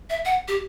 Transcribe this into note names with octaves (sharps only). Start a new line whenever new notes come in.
E5
F#5
G4